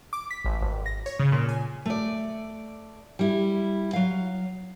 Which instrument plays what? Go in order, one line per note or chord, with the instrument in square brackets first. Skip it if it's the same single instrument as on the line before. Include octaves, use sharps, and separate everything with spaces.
[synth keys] D6
B6
A1
G#1
A#6
C#5
C#3
A#2
G#5
[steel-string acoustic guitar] A3 D5
G3 E4
F#3 F5